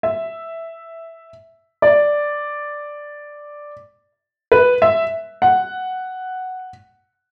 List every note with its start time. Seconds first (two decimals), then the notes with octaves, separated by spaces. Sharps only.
0.03 E5
1.82 D5
4.52 B4
4.82 E5
5.42 F#5